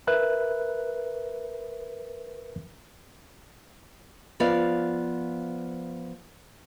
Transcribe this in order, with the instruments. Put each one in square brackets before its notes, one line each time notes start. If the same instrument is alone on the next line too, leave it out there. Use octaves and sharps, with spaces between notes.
[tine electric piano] A#4 B4 E5 F#6
[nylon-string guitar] F3 B3 D5 F5